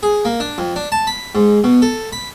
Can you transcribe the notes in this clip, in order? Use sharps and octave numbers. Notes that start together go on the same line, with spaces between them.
G#4
A#3
D4
F2
D4
A5
B5
G#2
B2
A4
B5